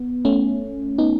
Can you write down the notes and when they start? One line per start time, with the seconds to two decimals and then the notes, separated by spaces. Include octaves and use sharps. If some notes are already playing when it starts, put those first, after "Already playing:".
Already playing: B3
0.25 A3 C#4
0.98 B3 D#4